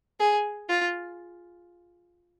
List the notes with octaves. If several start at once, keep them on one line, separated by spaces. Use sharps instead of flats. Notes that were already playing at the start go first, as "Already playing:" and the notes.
G#4
F4